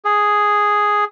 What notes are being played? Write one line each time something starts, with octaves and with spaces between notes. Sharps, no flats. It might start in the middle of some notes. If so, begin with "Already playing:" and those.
G#4